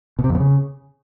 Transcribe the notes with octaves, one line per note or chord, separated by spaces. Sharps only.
B2
C3
F2
B2
C#3